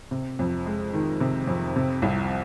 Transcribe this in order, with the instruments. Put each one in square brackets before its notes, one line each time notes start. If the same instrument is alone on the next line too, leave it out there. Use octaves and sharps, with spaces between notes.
[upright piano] C3
F2
G#3
D#3
C3
F2
C3
C2